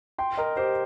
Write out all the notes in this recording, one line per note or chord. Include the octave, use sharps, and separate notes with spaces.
G5 C6
A#4 D#5
G4 C5